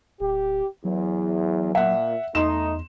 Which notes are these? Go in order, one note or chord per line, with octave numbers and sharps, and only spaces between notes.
D1 G4
E2 F#3
A#2 E5 F#5
E2 A3 D#4 C6 E7